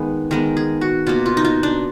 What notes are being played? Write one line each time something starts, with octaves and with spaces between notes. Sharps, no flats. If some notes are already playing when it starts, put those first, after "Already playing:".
Already playing: D#3 G#3 B3
D#3 G#3 B3 A#4
G#4
F#4
B2 A#3 F4
F4
D#4
F4
D4